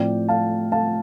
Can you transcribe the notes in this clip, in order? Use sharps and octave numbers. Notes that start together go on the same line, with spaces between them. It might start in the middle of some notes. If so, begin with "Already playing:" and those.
Already playing: A2 F3 C4 D5 G5
F5 A5
F5 A5